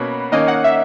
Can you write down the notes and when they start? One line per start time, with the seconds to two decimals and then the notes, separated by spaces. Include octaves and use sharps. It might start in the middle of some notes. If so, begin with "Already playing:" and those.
Already playing: B2 A#3 C#4 F#4 B5
0.32 D#3 A#3 C#4 D#5
0.48 F#5
0.64 E5